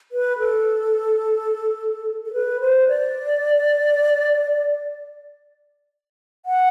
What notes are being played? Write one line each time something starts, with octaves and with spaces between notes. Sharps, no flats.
B4
A4
A4
B4
C5
D5
F#5